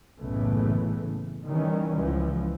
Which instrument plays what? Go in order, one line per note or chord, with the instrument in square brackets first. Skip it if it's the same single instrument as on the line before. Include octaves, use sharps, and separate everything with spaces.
[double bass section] F#1 B1 A2 C#3 E3 A3
D#3 E3 G3 C#4
C#2 E3 F3